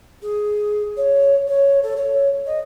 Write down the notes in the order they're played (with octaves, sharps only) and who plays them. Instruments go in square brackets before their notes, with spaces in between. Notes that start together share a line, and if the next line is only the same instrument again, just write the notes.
[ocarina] G#4
C#5
C#5
A4
C#5
D#5